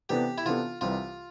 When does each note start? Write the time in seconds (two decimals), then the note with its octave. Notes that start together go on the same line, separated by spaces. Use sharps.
0.09 C3 E3 B3 D4 G4 A4
0.38 E4
0.45 C3 E3 B3 D4 F4 A4
0.81 C2 C3 E3 G3 F4